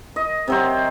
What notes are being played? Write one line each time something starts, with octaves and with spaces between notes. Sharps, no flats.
D#5
C3 F#3 C5